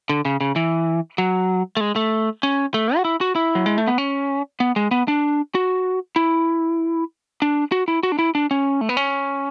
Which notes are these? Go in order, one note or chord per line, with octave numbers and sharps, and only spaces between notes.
D3
C#3
C#3
E3
F#3
A3
G#3
A3
C#4
A3
F#4
E4
F#4
E4
F#3
G#3
A3
B3
C#4
B3
G#3
B3
D4
F#4
E4
D4
F#4
E4
F#4
D4
E4
D4
C#4
A3
B3
C#4